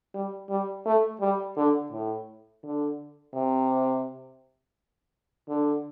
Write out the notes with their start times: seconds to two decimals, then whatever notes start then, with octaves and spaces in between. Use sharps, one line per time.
0.15 G3
0.50 G3
0.86 A3
1.21 G3
1.57 D3
1.92 A2
2.64 D3
3.35 C3
5.49 D3